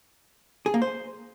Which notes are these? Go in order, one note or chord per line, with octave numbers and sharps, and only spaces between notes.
G#4
A#3
C5